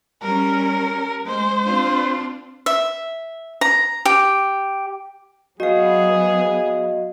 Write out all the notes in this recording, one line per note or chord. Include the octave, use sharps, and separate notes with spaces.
G3 C#4 A#4
G#3 C5
C4 D4 F4
E5
A#5
G4
F#3 B3 F#4 G#4 D#5 F5